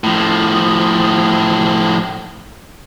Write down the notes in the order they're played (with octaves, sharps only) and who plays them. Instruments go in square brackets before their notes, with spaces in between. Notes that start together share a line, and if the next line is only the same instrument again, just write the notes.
[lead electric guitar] A2 F3